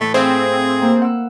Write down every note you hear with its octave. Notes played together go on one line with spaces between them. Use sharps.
A2 E3 A3
C4 G#4 C5 E5 F5
A#3
F#5 E6